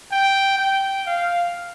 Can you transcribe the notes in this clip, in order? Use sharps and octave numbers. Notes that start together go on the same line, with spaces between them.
G5
G5
F5